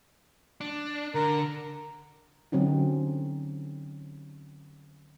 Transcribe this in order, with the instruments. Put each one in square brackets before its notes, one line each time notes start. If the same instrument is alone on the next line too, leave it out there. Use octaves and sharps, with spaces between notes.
[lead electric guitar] D4
[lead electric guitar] D3 [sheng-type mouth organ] A#4
[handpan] D3 F#3 C4 C#4 D#4